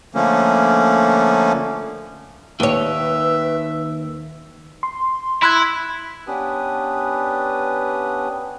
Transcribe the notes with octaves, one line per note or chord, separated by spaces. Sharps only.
D3 F3 A3 A#3 C#4
D#2 D#3 B4 C#5 E5
C6
E4 B5 C6 F#6 G#6
B3 C#4 D4 G4 B4 D#6